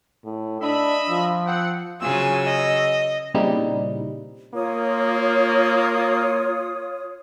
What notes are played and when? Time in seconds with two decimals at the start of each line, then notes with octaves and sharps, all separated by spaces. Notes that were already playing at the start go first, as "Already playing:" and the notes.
0.24 A2
0.61 D4 D#5 E5 B5
1.09 F3
1.46 C4 F#5
2.01 C#3 F#3 F4 G#4 G#5 E6
2.45 D#5
3.34 A#2 C#3 G3 C4 D#4 E4
4.54 A#3 F4 C#5 D#6